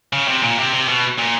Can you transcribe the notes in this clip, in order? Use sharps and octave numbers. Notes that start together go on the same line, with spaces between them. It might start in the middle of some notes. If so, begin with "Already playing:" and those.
C#3
C3
A#2
C3
C3
B2
A#2